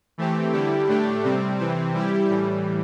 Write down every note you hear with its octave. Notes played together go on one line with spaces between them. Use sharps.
E3 A3 C4 G4
D3 G3 E4 G4
A2 A3 D4 G4
C3 G3 C4
C3 E3 C4
G3 E4 G4
A2 E3 G3